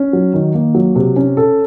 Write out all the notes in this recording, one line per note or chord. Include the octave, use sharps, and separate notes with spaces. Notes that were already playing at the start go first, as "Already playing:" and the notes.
Already playing: C#4
F#3
D#3
A#3
F#3
C3
C#4
A4